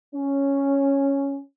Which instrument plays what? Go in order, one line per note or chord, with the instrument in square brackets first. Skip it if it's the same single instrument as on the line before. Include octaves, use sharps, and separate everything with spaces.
[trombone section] C#4